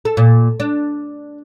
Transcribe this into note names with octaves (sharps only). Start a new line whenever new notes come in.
A4
A#2
D4